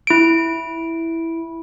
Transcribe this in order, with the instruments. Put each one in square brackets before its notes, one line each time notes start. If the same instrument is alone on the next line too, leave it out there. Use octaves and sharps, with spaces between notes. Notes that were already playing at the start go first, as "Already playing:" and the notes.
[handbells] E4 D7